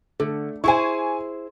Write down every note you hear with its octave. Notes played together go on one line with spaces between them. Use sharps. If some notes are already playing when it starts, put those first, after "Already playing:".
D3 A3
E4 G#4 C5 G#5 C#6